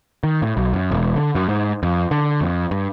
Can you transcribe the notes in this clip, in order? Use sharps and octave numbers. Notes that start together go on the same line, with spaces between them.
D#3
A2
B1
F#2
E1
D3
F#2
G#2
F2
D3
F2
G2